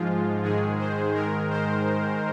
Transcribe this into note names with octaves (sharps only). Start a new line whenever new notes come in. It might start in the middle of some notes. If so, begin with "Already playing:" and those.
Already playing: G#2 F3 G#3 F4
G#2 D#3 G#3 G#4
C5
G#2 D#3 G#3 A#4
C5